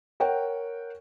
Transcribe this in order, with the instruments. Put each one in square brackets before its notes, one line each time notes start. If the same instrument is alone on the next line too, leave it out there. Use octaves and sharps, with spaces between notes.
[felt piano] A#4 C#5 F#5 G5